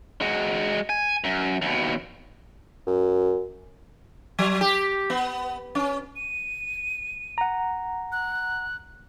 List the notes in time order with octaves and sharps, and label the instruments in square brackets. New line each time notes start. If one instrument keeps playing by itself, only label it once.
[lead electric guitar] G#3 F#4
G#5
F#2
D#2 B2
[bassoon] F#2
[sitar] F#3
G4
B3
C#4
[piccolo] D#7
[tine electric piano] F#5 A#5
[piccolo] F#6